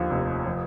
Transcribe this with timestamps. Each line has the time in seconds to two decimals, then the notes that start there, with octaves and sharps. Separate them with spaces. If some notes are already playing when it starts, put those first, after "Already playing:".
Already playing: D#2 D3 F3
0.10 F1
0.46 F3